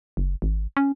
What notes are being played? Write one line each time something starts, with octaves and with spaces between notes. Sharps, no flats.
F#1
G#1
C#4